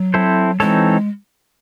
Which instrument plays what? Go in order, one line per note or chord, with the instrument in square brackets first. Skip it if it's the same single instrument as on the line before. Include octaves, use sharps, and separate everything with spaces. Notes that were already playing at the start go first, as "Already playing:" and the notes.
Already playing: [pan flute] F#3
[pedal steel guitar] C4 E4 A4 C5
[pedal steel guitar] E3 C4 D#4 A4 C#5 [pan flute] G#3